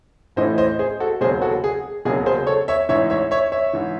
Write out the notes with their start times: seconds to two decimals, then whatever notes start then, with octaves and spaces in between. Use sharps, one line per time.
0.36 A1 A2 E3 C5 D#5
0.58 C5 D#5
0.79 G#4 C5
1.00 F#4 A4
1.21 E1 D#2 C#3 F#3 G#4 C5
1.42 F#4 A4
1.64 G#4
2.05 E1 D#2 C#3 F#3 G#4
2.26 G#4 C5
2.47 A4 C#5
2.68 C#5 E5
2.89 A1 G#2 E3 C#5 E5
3.10 C#5 E5
3.31 C#5 E5
3.52 C#5 E5
3.73 G#2 E3